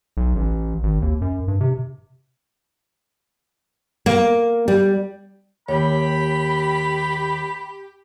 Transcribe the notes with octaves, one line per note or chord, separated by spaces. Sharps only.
B1
A1
G#1
D#2
F#2
G2
C3
A#3
G3
D#2 G4 C#5 B5